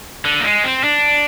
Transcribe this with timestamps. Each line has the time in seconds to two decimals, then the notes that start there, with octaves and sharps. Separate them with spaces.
0.25 D3
0.40 A#3
0.44 G#3
0.64 C4
0.84 D4